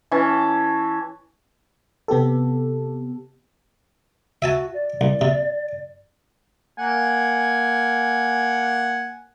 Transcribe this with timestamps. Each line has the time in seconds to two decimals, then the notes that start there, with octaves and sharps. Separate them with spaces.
0.11 E3 C#4 E5 A5
2.08 C3 B3 G4 A4
4.42 F#4 E5 G#5 A5
4.74 D5
5.01 C2
5.21 C3
6.78 A#3 F#5 G#5